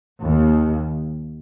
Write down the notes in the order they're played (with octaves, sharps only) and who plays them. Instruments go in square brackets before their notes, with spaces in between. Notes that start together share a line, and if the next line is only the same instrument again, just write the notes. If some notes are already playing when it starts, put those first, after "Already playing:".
[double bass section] D#2